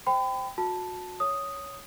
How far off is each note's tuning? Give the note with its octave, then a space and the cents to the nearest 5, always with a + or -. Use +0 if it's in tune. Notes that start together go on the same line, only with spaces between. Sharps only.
C5 +5 G5 +0 B5 +40
F#4 -25 A5 +0
C#5 +0 D#6 +0